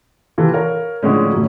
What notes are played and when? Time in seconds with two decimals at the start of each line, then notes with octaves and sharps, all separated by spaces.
0.38 C3 E3 F4 A4
0.54 A#4 C#5 F5
1.03 A2 D3 F3 G#3 C#4
1.33 F#2 A2